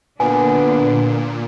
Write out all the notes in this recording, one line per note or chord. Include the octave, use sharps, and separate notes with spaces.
A#2 D3 B3 D4 G#5